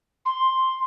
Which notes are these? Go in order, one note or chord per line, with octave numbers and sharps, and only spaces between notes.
C6